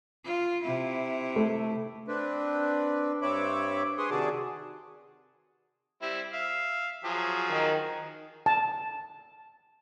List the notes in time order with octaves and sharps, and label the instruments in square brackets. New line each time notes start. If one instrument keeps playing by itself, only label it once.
[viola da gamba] F4
C3 E4
[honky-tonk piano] A3
[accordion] C4 D4 B4
G2 C4 C#5 E5 B5 D6
G#4 B4 C#5 C6 D#6
C3 D#3 F#4 G#4 D5 A5
[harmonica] G3 C4 E4
E5 F5
F3 F#3 G#4
[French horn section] D#3
[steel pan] A5